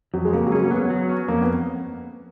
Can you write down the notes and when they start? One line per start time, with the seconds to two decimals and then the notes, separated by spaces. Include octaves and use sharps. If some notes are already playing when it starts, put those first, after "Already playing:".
0.14 F2 F#3
0.25 G#3
0.33 C#3 A#3
0.47 F#3
0.52 G#3 C#4
0.63 A#3
0.71 F#3 B3
0.90 F#3
1.09 C#4
1.28 F2 A#3
1.42 B3